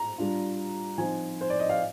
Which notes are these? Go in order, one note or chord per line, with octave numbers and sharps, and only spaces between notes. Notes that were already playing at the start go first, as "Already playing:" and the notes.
Already playing: A#5
G3 D4 F4
F3 C4 D#4 G#5
C5
D5
D#5
F5